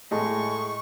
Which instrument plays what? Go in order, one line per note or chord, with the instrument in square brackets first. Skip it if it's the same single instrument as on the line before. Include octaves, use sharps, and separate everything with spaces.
[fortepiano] A2 [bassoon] G#3 [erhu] C#6